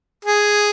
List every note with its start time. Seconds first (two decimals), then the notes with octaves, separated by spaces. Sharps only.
0.25 G#4